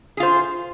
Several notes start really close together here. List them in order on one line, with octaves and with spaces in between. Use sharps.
G#4 F4 C5